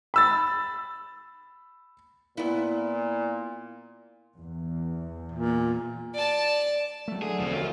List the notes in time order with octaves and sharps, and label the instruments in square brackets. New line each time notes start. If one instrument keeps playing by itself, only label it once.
[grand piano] B5 E6 A6
[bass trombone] A#2 [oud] B3 E4
[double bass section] E2
[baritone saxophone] A#2
[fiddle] D5 A5
[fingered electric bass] F#3 A3
[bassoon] D3 [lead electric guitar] G#4
[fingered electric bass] E1 D2 [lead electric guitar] F3 C4
[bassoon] F#2 [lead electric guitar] F4